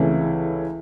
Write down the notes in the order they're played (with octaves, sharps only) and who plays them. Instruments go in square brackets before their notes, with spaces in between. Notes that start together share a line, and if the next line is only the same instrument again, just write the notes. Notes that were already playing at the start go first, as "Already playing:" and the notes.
Already playing: [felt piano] C#2 C3 E3 A3 C#4 [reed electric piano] E4 G#4